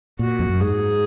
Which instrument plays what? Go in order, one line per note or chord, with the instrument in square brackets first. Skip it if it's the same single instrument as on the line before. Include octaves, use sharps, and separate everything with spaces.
[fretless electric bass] A#2 [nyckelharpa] F#4
[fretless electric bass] F2
F#2
[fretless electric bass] G#2 [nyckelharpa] G#4